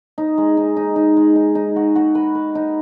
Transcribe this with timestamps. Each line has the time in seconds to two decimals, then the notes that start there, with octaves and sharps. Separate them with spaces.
0.18 D#4
0.37 G#3
0.57 D#4
0.76 D#4
0.96 D#4
1.17 G#3
1.36 D#4
1.55 D#4
1.76 F#4
1.96 F#4
2.15 B4
2.35 B4
2.55 D#4